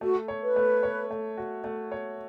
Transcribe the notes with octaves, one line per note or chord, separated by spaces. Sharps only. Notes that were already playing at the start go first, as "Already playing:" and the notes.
A3 F#4
C#5
B4
A3
C#5
A3
F#4
A3
C#5